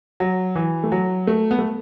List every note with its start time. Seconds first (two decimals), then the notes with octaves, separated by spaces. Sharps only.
0.20 F#3
0.55 E3
0.84 A3
0.92 F#3
1.27 A3
1.51 B3
1.59 A3